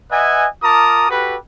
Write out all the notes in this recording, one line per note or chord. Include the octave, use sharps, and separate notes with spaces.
B4 D#5 E5 F#5 G#5
F4 A#4 A5 A#5 D6 D#6
F#4 G4 A4 B4